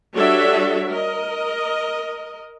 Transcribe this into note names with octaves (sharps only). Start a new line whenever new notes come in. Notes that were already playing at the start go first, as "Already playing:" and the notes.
G3 D4 F#4 A4 C#5 E5
A#4 D#5